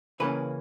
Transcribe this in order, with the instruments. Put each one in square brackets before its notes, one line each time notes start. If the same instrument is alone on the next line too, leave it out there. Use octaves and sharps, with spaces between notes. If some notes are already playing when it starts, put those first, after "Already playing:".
[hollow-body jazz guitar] C#3 E3 A#3 C#4 B4